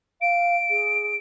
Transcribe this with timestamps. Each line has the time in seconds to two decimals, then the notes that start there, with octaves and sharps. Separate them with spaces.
0.21 F5 D7
0.70 G#4